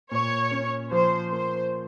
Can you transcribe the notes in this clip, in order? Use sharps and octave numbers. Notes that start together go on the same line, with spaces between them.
A#2 C#5
C#4
F3 C5
A#3 C5